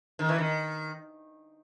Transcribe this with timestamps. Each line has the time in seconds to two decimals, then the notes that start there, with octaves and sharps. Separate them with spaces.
0.19 D#3
0.29 E3
0.39 D#3